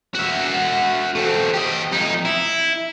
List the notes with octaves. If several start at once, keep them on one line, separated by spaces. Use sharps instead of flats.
F#4 E5
A3 C4
G4 D#5
F2 D#4
E4